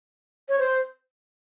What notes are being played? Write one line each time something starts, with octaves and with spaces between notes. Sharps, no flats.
C#5
C5